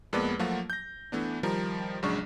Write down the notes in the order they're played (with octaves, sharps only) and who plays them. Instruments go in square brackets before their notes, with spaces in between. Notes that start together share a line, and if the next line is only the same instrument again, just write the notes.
[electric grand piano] F2 G#3 A#3 B3 B4 D5
F3 F#3 A3 A#3 F4 F#4
G6 A#6
E3 A3 B3 D4
D#3 F3 G3 A#4
A#1 C#3 F#3 G#3 D4 C#6